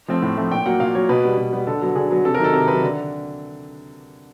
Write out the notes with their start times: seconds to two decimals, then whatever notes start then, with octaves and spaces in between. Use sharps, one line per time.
0.08 F3 A3 C4
0.22 A2
0.37 F3 A3 C4
0.51 A#2 G5
0.65 F#3 A#3 F#5
0.80 A#2 F5
0.95 F#3 A#3 C#5
1.09 B2 B4
1.24 G3 B3
1.38 B2
1.53 G3 B3
1.67 D3 A4
1.81 F#3 B3
1.96 D3 G#4
2.10 F#3 B3
2.25 C3 A4
2.35 A#4
2.39 D#3 F#3 A4
2.54 C3 A#4
2.68 D#3 F#3 B4
2.82 D3